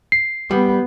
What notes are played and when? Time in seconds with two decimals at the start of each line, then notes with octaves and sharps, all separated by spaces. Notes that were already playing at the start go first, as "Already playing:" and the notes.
0.12 C7
0.51 G3 B3